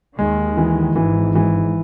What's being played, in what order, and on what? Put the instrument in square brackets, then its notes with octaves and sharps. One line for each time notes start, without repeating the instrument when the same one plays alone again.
[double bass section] D#2 D#3 [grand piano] G#3
[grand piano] E3
[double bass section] G#1 G#2 [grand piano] E3
[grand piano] E3